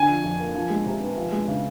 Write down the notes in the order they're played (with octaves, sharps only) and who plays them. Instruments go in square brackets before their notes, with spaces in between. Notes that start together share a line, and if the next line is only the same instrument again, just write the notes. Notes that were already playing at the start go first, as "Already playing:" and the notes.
Already playing: [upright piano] D3 [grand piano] G#5
[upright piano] F3
F2
A#3
F3
G#3
C3
B3
F3
G#3
C#3